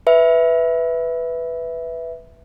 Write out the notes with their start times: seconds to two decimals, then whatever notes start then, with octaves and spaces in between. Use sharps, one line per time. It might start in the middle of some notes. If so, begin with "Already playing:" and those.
0.07 B4 E5